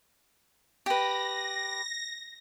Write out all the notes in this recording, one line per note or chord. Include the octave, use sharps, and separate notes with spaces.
G4 B4 A#6